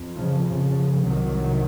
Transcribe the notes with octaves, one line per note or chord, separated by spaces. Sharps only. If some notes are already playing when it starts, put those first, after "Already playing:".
Already playing: F2
C#3 F3
C#3 F3
C2 C3 D#3 F#3